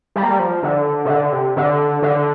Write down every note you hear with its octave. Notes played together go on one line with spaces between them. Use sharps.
G3
A#3
G3
F3
D3
C3
D3
C3
D3
D3